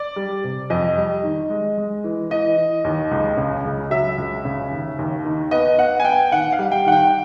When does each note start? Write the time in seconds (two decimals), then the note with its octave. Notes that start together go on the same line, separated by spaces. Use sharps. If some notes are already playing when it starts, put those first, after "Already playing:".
Already playing: D5
0.16 G3
0.44 C3
0.70 F2 D#5
0.97 G3
1.23 D#3
1.50 G#3
1.78 G#3
2.04 E3
2.30 E3 D#5
2.57 E3
2.84 D#2
3.11 C#2
3.37 C#3
3.65 C#2
3.91 F#3 E5
4.18 C#2
4.45 C#3
4.72 D#2
4.99 D#2
5.25 D#3
5.51 B3 D#5
5.79 B3 F#5
6.00 G#5
6.05 B3 G5
6.31 D#3 F#5
6.52 F5
6.59 G3
6.72 G5
6.86 D#3 F#5
6.92 G5